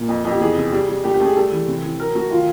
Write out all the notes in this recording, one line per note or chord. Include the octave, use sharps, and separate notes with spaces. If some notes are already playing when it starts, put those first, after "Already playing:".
Already playing: A#2
F2
F2
G4
E2 G#4
C3
G3
G3
A3 G4
G4
A3
G#4
G3 A4
E3
C3
E3
F#3 A#4
A3 F#4
D#3 F4